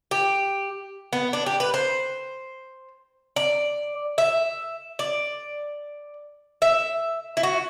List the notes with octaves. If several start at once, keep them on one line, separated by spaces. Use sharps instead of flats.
G4
B3
D4
G4
B4
C5
D5
E5
D5
E5
E4
F#4